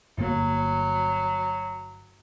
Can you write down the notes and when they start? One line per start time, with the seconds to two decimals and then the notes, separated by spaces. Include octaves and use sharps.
0.18 G1 F#3 A#3